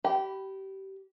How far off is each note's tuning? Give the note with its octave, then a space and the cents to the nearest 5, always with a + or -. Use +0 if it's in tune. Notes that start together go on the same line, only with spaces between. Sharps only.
G4 -25 B5 +0